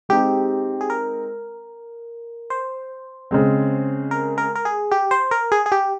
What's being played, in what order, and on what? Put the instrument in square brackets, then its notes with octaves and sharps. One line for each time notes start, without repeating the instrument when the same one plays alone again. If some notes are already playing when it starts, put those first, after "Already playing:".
[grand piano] G#3 C4 D#4 [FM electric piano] G4
[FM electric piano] G#4
A#4
C5
[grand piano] C#3 G#3 C4
[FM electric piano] A#4
A#4
A#4
G#4
G4
C5
A#4
G#4
G#4
G4